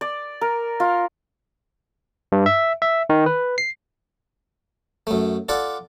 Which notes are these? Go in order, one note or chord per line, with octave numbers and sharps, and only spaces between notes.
D5
A#4
F4
G2
E5
E5
D#3
B4
C7
F#2 A3
F4 A4 D5 F#5 D6